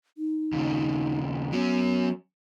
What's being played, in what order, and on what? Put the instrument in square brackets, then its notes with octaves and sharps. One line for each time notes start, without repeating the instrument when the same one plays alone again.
[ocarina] D#4
[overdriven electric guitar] D#2 C#3
[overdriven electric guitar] F#3 C#4 [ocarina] B3